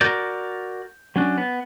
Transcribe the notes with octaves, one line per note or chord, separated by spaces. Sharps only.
F#4 A#4 D5 G6
F#3 C#4 D4
B3